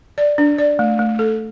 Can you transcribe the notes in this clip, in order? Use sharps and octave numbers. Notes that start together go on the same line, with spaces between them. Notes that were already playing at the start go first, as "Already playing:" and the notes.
D5
D4
D5
A3
A3
A4